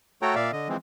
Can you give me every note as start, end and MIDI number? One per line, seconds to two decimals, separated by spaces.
0.22 0.35 57
0.22 0.35 66
0.22 0.35 69
0.22 0.35 73
0.22 0.35 79
0.22 0.35 82
0.35 0.51 46
0.35 0.51 74
0.35 0.51 76
0.35 0.51 77
0.52 0.68 50
0.52 0.68 75
0.69 0.77 52
0.69 0.77 53
0.69 0.77 56
0.69 0.77 60